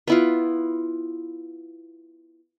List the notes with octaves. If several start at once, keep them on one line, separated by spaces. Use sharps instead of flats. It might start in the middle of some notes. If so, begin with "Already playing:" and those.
B3 E4 F4